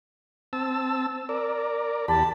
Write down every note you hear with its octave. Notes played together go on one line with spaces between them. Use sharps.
C4 A5 E6
A#4 D5
E2 G4 A5 B5